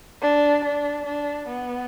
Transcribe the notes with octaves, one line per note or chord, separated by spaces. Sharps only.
D4
D4
D4
B3